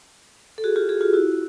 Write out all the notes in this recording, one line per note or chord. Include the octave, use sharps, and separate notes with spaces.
A4
F#4 G#4
F4 G4
F#4 G#4
F4 G4
E4 F#4